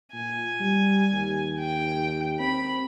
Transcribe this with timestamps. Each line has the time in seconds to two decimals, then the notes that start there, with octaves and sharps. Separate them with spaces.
0.13 A#2 G#5
0.60 G3
1.13 D#2
1.59 G5
2.40 C4 B5